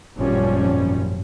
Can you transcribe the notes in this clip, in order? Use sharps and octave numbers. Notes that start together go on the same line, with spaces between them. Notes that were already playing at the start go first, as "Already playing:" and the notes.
G#1 F#2 A#2 F3 G3 C#4